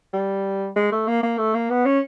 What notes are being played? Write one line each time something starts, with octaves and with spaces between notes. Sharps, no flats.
G3
G#3
A3
A#3
A#3
A3
A#3
B3
C#4